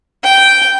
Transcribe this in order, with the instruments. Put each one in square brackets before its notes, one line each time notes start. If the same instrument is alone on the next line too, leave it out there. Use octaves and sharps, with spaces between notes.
[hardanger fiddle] G5